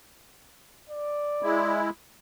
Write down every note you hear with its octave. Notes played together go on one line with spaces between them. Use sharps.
D5
G#3 E4